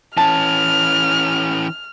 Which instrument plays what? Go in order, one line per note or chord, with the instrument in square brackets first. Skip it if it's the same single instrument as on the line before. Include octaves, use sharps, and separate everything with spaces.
[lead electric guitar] E3 C#4 [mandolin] A5 [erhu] F6